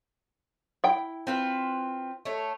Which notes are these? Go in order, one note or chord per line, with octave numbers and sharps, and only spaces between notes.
E4 G5
C4 F4 B4
A3 C#5